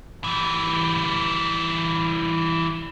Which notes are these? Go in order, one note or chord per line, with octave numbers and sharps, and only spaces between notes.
E3 G3